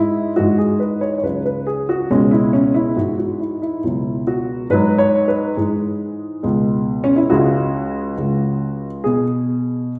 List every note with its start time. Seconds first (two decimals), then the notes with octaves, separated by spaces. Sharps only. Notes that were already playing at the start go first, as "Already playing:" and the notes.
Already playing: G#2 G#3 E4
0.36 G#2 E3 G#3 F#4
0.58 G#4
0.80 B4
1.01 C#5
1.18 C#5
1.23 C#2 C#3 F#3 B4
1.46 B4
1.67 G#4
1.89 F#4
2.10 C#2 B2 G#3 C#4
2.31 E4
2.53 C#4
2.74 E4
2.96 G#2 E3 G#3 F#4
3.18 F#4
3.40 E4
3.62 E4
3.83 C#2 B2 F#3 E4
4.27 F#4
4.70 G#2 F#3 B4
4.98 C#5
5.28 B4
5.57 G#2 E3 G#3 G#4
6.43 C#2 B2 G#3
7.04 C#4
7.16 E4
7.30 C#2 C#3 G#3 F#4
8.17 C#2 C#3 G#3
9.04 B2 G#4